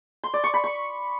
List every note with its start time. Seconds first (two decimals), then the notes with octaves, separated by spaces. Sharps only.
0.24 C6
0.34 D5
0.44 C#6
0.54 B5
0.64 C#6